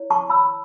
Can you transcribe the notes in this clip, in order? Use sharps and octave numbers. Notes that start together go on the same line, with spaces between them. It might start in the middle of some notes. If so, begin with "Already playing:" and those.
Already playing: E4 C#5
A5 C#6
B5 E6